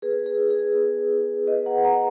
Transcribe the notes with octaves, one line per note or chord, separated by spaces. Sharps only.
B3 G#4 B4
G#4
E4
G#4
B3
E4
B3 B4 D#5
F#5 A#5
E4 F#5 A#5